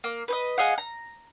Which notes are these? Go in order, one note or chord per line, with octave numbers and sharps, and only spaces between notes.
A#3
B4 C5 D#5
G#4 D#5 F5 F#5
A#5